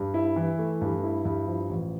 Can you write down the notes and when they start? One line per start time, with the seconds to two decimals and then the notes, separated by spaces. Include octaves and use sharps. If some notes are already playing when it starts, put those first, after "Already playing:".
Already playing: G2
0.14 E4
0.36 E3
0.59 A3
0.81 G2
1.03 E4
1.25 G2
1.47 F3
1.69 A1